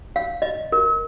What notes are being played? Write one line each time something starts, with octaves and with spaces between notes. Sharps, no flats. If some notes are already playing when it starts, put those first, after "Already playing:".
F5
D#5
A#4